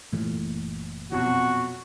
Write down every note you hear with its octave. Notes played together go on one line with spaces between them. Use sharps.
F#1 A#2 E3 A3
F2 B2 F#3 F#4